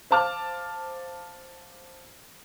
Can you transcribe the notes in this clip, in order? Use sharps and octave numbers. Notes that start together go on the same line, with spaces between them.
C5 F5 A5 D6 F6